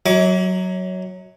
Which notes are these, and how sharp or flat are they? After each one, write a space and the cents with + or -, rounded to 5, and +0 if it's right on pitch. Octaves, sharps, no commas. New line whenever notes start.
F#3 +0 D#5 +45 D6 -35